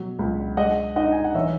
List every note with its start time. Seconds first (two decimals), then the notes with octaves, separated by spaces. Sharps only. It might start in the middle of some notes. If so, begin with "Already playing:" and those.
Already playing: B2 F#3
0.19 C#2
0.57 G#3 D#5 F#5
0.96 D#4 D#5 F#5
1.12 G#5
1.24 F#5
1.35 E3 C#5 E5